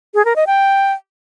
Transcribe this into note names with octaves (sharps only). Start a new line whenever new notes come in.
G#4
A#4
D#5
G5